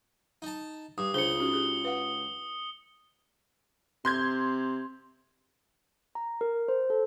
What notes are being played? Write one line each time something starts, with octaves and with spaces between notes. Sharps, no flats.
D#4 A5
G2 D#6
C#2 D4 G#4 C5 C#7 G7
C#4 D#4 F#4
G4 G#4
B4 F5 F#5
C3 C6 G6 G#6
A#5
A#4
C5
A4